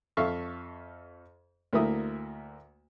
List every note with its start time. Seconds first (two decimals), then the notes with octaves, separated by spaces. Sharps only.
0.17 F2 A4 E5 F5 C#6
1.73 D2 A3 A#3 E4 E5 D#6